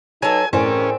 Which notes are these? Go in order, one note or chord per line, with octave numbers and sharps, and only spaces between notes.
F#3 D#4 F#4 A4 B4 G#5
A2 E3 C4 C#4 G#4 A#4 D5 G#5